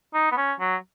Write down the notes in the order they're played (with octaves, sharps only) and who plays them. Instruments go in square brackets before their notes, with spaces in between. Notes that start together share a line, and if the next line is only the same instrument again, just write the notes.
[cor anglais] D#4
B3
C#4
F#3